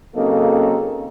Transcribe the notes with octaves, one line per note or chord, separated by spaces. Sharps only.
C#3 F#3 A#3 C4 D#4 A4